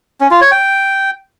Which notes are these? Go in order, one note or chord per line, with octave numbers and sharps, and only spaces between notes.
C#4
F4
C#5
G5